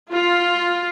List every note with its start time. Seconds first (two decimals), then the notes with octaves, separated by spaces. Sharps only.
0.14 F4